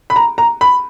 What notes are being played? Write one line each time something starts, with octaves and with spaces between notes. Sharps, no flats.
B5
A#5
A#5
B5